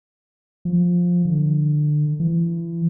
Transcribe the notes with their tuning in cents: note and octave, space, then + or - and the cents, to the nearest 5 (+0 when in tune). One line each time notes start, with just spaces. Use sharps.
F3 +10
D3 +25
E3 +35